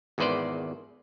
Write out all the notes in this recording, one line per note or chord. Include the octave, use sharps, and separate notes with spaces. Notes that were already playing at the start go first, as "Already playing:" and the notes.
G#1 E2 D#3 B4 C5 D5